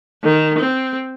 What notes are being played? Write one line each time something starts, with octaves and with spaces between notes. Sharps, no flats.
D#3
C4